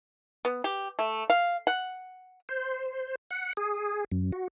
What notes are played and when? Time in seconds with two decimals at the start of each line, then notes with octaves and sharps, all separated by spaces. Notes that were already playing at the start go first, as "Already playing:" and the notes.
0.45 B3
0.64 G4
0.99 A3
1.30 F5
1.67 F#5
2.49 C5
3.31 F#5
3.57 G#4
4.12 F#2
4.32 F#4